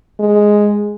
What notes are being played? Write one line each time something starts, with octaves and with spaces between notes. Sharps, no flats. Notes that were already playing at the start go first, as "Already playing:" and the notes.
G#3